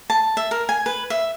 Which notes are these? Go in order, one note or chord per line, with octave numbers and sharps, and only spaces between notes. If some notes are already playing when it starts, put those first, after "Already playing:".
A5
E5
A#4
G#5
B4
E5